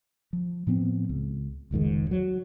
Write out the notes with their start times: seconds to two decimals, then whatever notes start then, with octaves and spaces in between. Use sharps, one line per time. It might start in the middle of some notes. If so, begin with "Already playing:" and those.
0.33 F3
0.67 A2 F3 B3 C4
1.09 C#2
1.71 F1 C#2 G#2 D#3
2.11 F#3